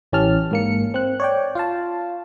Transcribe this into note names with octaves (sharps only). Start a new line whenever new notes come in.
A1 E3 C#4 G4 A5 F6
G#2 A#3 C#7
C4 F#6
C#5 D5 G5
F4 F5 A5